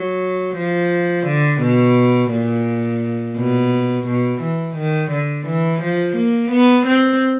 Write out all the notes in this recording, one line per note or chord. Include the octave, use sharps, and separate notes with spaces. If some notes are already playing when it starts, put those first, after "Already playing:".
Already playing: F#3
F3
D3
B2
A#2
B2
B2
E3
D#3
D3
E3
F3
A#3
B3
C4